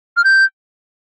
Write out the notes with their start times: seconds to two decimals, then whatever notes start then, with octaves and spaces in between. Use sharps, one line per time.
0.17 F6
0.24 G6